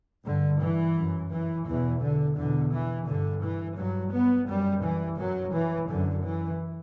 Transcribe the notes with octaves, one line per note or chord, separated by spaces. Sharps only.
G2 D3
E3
F#2
E3
E2 B2 E3
D3
E2 B2 D3
E3
G2 D3
E3
G2 F#3
B3
F#2 G3
E3
F#2 F#3
E3
F#2 D3
E3